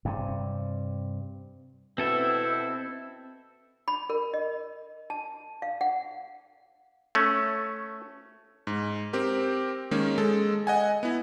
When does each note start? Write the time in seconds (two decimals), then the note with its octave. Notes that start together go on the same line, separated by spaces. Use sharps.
0.05 G2 C3
1.98 B2 C4 E4 A4 E5
3.88 B5
4.10 A#4
4.34 D#5
5.10 A5
5.62 F5
5.81 F#5
7.15 A3 C#4
8.67 G#2
9.13 C4 G4 A#4
9.91 D#3 G#3 A#3 C#4
10.18 G#3 A4
10.67 D#5 F#5 G#5
11.03 B3 E4